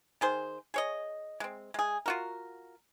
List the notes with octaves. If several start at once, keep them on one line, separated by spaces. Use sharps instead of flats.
D#3 G#4 C5
G#4 C#5 D#5
G#3 C4
G#3 G#4
F4 F#4 A#4